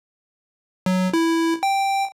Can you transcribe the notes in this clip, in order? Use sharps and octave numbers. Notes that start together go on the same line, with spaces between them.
F#3
E4
G5